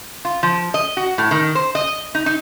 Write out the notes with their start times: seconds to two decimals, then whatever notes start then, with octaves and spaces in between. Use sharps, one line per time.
0.25 F4
0.43 F3
0.74 D#5
0.97 F#4
1.18 A2
1.31 D#3
1.55 C5
1.75 D#5
2.15 D#4
2.26 D#4